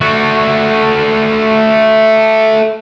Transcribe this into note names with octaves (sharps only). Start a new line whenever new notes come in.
A3 F#4